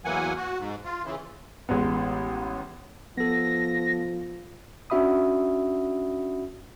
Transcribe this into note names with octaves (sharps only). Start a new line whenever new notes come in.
E2 E3 F#3 A#3 F#5 G#5
F#4
G#2
F4
C#3 E3
A1 G#3 B3
F3 B3 A4 A#6
C#4 D4 F#4 E5 B5 D#6